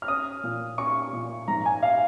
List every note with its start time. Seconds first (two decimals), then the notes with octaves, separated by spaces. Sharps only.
0.02 F6
0.08 C#4 D#6
0.43 A#2
0.78 C#4 C#6
1.13 A#2
1.48 G#2 A#5
1.66 G#5
1.83 F5